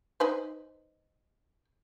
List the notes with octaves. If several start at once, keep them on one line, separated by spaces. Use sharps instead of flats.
D#4 B4 C5